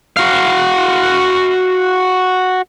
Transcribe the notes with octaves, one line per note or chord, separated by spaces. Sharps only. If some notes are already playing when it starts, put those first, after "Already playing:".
F#4 F5